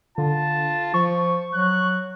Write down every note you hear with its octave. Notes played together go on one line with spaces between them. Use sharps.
D3 F4 A5
F3 C#6
F#3 F#6